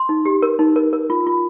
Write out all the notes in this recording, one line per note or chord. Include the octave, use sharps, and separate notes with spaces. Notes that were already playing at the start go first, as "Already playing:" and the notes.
Already playing: C6
D#4
G4
A#4
D#4
A#4
A#4
F4
F4